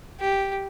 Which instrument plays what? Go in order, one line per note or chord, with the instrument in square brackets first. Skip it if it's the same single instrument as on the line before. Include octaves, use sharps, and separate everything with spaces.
[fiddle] G4